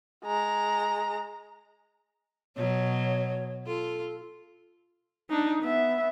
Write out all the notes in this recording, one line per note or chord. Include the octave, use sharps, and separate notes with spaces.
G#3 A#5
B2 F#3 C#5
F4 A4
D4 D#4
B3 E5